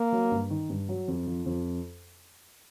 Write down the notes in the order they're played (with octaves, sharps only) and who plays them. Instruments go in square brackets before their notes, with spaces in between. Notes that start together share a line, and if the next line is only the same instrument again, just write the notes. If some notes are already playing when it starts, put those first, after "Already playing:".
Already playing: [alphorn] A#3
[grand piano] F#3
G2
D#3
G2
F#3
F2
F3
F2